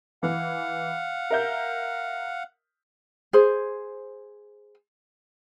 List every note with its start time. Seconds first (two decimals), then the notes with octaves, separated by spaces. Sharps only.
0.23 E3 F5 F#5
1.30 A#4 E5 G6
3.33 G#4 C5